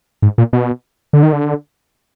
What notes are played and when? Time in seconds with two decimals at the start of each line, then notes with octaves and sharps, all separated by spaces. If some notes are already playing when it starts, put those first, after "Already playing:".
0.22 G#2
0.38 A#2
0.53 B2
1.13 D3
1.23 D#3
1.33 D3